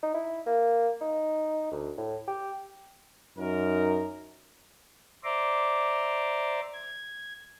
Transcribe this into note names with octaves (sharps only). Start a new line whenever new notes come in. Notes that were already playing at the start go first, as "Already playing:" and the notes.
D#4
E4
A#3
D#4
D2
A2
G4
F#2 D#4 A#4
C5 D5 E5 A#5 C6 D6
G#6